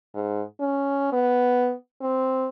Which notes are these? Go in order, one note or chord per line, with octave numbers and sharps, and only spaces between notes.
G#2
C#4
B3
C4